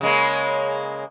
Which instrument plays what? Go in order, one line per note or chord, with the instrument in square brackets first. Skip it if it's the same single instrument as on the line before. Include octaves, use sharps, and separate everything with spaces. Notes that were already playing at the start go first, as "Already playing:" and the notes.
[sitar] C#3 G#3 A#3